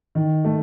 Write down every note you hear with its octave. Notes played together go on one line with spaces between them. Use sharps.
D#3
A3